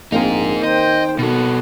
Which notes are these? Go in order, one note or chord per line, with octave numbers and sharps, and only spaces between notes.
A#1 A#3 C4 D#4 G#4 A#4
D#3 C5 D#5 G5
B2 B3 F#4 A4